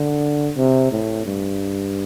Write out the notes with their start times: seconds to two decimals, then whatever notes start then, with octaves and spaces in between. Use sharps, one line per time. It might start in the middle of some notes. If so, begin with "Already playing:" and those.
Already playing: D3
0.57 C3
0.92 A2
1.26 G2